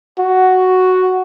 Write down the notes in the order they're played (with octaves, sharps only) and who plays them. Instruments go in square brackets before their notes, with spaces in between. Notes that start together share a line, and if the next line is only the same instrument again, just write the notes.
[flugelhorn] F#4